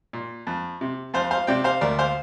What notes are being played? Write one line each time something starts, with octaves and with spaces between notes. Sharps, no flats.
A#2
F2
C3
F2 C5 F5
C5 F5
C3 D5 G5
C5 F5
D2 A#4 D5
C5 F5